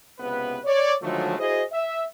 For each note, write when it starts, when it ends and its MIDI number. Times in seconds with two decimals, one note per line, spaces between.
0.19 0.58 37
0.19 0.58 48
0.19 0.58 59
0.19 0.58 71
0.65 0.94 73
0.65 0.94 74
1.02 1.34 50
1.02 1.34 51
1.02 1.34 53
1.02 1.34 54
1.02 1.34 56
1.02 1.34 57
1.37 1.62 64
1.37 1.62 66
1.37 1.62 68
1.37 1.62 72
1.37 1.62 75
1.71 2.03 76